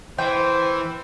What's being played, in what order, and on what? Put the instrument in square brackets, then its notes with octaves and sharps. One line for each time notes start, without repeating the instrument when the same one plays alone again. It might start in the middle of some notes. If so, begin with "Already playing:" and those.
[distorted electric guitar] E3 [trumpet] C5 [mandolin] G5